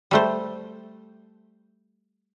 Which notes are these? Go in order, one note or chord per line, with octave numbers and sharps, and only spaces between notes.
G3 A3 C5